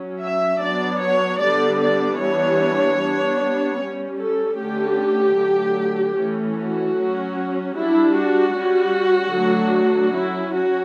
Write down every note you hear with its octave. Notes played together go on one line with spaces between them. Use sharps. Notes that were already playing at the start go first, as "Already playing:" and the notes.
Already playing: F#3 C#4
E5
F#3 B3 D4 D5
C#5
D3 G3 B3 D4 D5
D5
E3 G3 B3 D4 C#5
G3 B3 D4
G3 C#4
A4
D3 A3 C#4 G4
D3 F#3 A3
E3 A3 C#4
F#4
F#3 C#4
G3 D4 E4
F#4
G3 C#4
D3 F#3 A3 D4
F#3 C#4 E4
F#4